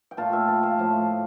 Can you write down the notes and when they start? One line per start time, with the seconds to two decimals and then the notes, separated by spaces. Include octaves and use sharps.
0.11 G5
0.17 A#2 A3 F5 A5
0.33 E5 G5
0.48 F5 A5
0.63 F5 A5
0.78 A2 F3 A3